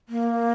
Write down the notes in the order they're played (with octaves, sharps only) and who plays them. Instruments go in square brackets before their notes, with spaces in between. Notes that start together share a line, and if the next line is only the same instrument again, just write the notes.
[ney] A#3